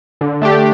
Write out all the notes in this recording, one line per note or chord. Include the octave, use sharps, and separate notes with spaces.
D3
A3 D4 G4